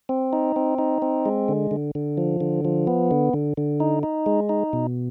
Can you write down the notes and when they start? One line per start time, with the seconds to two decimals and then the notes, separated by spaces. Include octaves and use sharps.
0.09 C4
0.33 D#4
0.56 C4
0.78 D#4
1.02 C4
1.26 G#3
1.48 D3
1.71 D3
1.95 D3
2.18 F3
2.41 D3
2.65 F3
2.87 B3
3.11 D3
3.34 D3
3.57 D3
3.80 D#4
4.03 D#4
4.26 G#3
4.49 D#4
4.73 B2